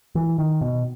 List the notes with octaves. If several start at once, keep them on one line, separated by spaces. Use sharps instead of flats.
E3
D#3
B2